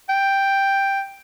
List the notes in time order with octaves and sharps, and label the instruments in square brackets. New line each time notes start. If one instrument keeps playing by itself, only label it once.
[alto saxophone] G5